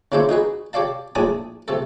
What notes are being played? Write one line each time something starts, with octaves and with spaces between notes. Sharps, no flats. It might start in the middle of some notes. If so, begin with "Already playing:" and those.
C#3 A#3 D4 E4 C5 C#5
D#4 F#4 G#4 B4
G4 C#5 D5 F5 A5
A#1 A2 D4 G#5 A5 D#6
C3 A3 A4